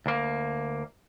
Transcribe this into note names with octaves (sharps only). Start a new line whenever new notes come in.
D2 A#3